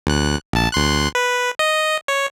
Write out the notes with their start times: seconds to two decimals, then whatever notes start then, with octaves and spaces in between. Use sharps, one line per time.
0.07 D2 F#6
0.53 A#1 A5
0.72 D2 C6 F#6
1.15 B4
1.59 D#5
2.08 C#5